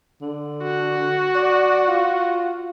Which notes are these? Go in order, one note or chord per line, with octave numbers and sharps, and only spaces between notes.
D3
F#4
D5
F4